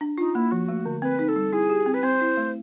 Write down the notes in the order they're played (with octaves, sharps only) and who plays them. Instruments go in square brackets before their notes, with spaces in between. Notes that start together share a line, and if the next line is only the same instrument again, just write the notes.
[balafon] D4
[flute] D#4 [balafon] F4
[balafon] A#3 [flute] E4
[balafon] F3 [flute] F#4
[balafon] A3
D3
[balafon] C4 [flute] B4
[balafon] D#4
[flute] A4
[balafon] G3
[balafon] E4 [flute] G#4
[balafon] G4
C4
[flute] B4
[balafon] C4 [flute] C5
[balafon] E4
A3